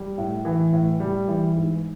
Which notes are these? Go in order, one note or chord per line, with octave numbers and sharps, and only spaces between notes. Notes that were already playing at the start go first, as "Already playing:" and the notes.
Already playing: G3
A2
E3
A2
G3
E3
G#2